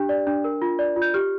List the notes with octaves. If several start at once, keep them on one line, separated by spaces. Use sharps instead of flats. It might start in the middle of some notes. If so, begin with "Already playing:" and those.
Already playing: D4 G4
D5
D4
A#4
F4
D5
F4
G6
G4 F6